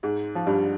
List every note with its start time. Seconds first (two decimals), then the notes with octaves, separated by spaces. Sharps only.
0.03 G#2 G#3
0.35 F3
0.46 G2 G3